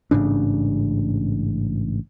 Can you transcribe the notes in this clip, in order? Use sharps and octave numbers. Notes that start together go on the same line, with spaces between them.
A1 G#2 C#3 D4